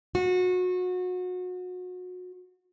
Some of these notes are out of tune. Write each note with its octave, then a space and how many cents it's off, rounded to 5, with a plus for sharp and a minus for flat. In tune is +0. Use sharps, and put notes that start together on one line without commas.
F#4 -30